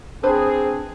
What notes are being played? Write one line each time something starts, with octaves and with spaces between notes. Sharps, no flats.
C4 D4 G#4 B4 C5